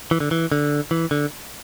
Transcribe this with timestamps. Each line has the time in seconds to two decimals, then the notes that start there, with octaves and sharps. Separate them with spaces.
0.11 E3
0.20 D3
0.31 E3
0.52 D3
0.91 E3
1.11 D3